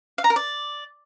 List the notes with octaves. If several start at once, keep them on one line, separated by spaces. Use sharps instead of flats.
F5
A#5
A#4
D5